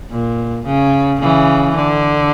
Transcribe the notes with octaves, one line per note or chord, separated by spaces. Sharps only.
A#2
C#3
C#3 E3
D3